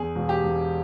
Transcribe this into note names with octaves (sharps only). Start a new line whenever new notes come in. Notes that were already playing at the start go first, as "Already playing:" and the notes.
Already playing: E2 G#4
E1
G4
E1